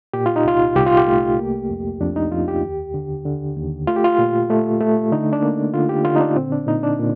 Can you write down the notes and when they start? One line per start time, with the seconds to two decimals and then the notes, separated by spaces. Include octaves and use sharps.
0.13 A#2 G4
0.26 F4
0.36 D#4
0.45 C2 F4
0.76 C2 G4
0.86 F4
0.97 G4
1.07 A3
1.39 A#3
1.70 F2
2.00 F2 D4
2.16 D#4
2.31 F2 F4
2.48 G4
2.63 D#2
2.94 D3
3.25 D3
3.57 D#2
3.87 A3 F4
3.96 G4
4.04 F4
4.19 A#2
4.50 A3
4.80 A3
5.12 D3 D#4
5.33 D4
5.43 A#3
5.74 D3 F4
5.89 G4
6.04 D3 F4
6.16 D#4
6.21 D4
6.36 A#2 C4
6.52 D4
6.67 A#2 D#4
6.83 D4
6.99 A#2